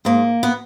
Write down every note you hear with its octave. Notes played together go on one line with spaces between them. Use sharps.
G#2 A#3
B3